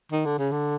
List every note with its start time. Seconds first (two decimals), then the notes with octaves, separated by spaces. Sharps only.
0.12 D#3
0.25 D3
0.39 C#3
0.52 D3